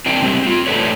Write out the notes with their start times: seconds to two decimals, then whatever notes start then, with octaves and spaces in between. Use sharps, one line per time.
0.06 C4 D4 E4 A#4 G5
0.23 G3 G#3 C4
0.43 C4 F4
0.67 A2 D4 A4 B4 C#5